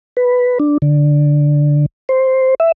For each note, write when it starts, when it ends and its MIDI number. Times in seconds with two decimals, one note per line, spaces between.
0.17 0.58 71
0.59 0.78 62
0.82 1.86 50
2.09 2.55 72
2.60 2.72 76